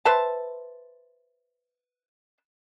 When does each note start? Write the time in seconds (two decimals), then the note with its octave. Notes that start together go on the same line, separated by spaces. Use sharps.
0.05 B4 C5 E5 A5